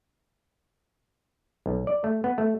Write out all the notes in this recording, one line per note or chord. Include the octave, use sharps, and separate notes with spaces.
B1
D5
A3
B3
A3